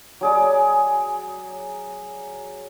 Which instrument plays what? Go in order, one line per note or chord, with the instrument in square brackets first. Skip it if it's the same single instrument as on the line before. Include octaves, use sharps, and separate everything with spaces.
[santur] F#3 G#4 D5